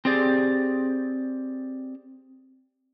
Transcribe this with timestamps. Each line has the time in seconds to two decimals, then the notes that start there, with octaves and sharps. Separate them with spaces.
0.05 C4 G4 G#4 D5